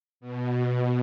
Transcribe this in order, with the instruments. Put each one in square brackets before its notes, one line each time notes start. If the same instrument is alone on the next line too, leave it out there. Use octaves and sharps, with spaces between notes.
[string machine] B2